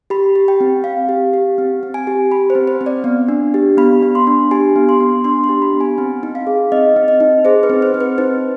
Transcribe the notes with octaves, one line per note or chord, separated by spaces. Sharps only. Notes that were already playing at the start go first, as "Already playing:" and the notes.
G4 B5
G4
G5
C4
C4 F5
G4
G4
C4
C4
G#5
G4
G4 B5
C5
C4
C5
C4
D5
B3
D4
G4
B3 B5
B3
C6
D4
G4 G#5
B3
C6
B3
D4 C6
C6
G4
B5
B3
G#5
C4
D#4
F5
G#4
C4 D#5
C4
D#5
D#4
G#4 C5
B4
C4
C5
C4
B4
D#4 C5